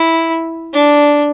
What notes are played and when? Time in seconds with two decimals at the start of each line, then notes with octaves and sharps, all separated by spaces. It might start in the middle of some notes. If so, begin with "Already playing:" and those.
Already playing: E4
0.73 D4